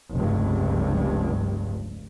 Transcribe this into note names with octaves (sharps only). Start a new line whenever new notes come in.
F1 C#2 G2